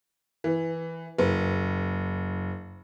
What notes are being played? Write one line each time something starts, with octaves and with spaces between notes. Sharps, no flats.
E3
F#1